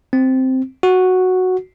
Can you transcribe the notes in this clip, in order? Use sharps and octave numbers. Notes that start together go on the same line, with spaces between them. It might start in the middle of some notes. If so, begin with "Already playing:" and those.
C4
F#4